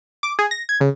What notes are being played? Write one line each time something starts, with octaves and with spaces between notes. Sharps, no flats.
D6
G#4
A#6
G#6
C#3